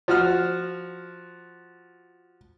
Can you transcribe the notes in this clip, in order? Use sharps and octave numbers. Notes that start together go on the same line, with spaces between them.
F3 F#4 F6